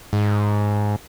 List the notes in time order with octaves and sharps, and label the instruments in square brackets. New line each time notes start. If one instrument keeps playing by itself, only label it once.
[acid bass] G#2